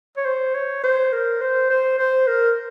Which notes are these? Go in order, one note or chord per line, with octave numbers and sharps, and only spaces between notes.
C#5
C5
C#5
C5
A#4
C5
C5
C5
A#4